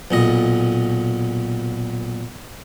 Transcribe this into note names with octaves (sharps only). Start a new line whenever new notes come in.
B1 A#2 D#5